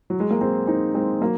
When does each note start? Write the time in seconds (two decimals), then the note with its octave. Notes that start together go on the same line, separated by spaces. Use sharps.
0.10 F#3
0.20 G#3
0.31 A#3
0.41 G#3 C4
0.67 C4 D#4
0.94 G#3 C4
1.21 F#3 A#3